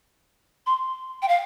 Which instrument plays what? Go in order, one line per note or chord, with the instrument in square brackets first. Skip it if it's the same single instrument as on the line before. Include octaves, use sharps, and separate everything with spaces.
[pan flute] C6
G5
F5